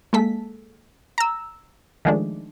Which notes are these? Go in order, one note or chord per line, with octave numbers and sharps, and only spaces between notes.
G#3 A#3 A4 B6
A#5 E6
D#3 F3 G#3 A3 D4